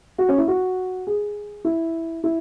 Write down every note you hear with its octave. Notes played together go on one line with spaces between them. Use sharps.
F#4
C#4
E4
F#4
G#4
E4
E4